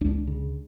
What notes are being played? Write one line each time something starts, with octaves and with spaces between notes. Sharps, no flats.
C#2 D4
C#3